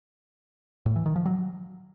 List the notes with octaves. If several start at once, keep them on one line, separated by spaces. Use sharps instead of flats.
A2
E3
D#3
F3
F#3